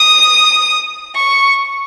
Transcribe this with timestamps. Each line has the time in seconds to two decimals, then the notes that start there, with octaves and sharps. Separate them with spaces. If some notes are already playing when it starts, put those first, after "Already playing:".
Already playing: D#6
1.15 C#6